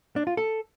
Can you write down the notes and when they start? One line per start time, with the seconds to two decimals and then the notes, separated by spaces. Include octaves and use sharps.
0.16 D4
0.27 F4
0.37 A4